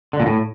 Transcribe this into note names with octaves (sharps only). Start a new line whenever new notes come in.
D3
A#2
A2